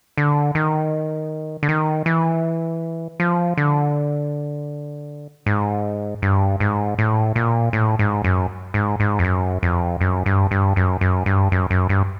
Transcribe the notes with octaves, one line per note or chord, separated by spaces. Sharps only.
D3
D#3
D3
D#3
E3
F3
D3
G#2
G2
G#2
A2
A#2
A2
G#2
F#2
G#2
G#2
F2
F#2
F2
F#2
G2
G2
F#2
F#2
G2
F#2
F#2
G2